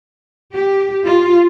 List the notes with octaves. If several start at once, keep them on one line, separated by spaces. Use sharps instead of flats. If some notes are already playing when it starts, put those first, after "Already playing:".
G4
F4